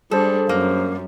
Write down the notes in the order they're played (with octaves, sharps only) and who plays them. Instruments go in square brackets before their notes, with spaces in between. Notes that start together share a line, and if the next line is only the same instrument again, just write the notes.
[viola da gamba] G3 D4 [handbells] G#4 C5 [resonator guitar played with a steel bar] A4
[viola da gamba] F#2 [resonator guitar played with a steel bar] A#3